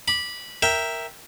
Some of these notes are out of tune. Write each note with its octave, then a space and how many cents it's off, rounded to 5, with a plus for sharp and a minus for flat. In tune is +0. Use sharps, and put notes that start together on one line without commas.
B5 -15 D6 +0
A#4 +0 E5 +0 G5 +0